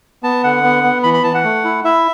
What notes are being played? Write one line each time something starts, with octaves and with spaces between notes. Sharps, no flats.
B3 A5
D3 F#5
B3
B3
E3 B5
B5
E3 A5
F#5
A3
E4
E4 E5